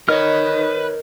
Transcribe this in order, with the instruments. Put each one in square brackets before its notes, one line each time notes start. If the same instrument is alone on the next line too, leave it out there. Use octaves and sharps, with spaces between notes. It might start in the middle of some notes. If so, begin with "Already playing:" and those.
[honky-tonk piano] D#4 [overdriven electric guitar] A#4 D#5 [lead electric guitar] B4 [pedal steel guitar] C#5 F6